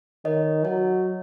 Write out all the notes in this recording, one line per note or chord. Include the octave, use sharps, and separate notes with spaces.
D#3 C#5 D#5
F#3 C#5 D#5